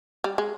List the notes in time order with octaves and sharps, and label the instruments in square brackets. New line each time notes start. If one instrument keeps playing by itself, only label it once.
[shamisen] G3
G#3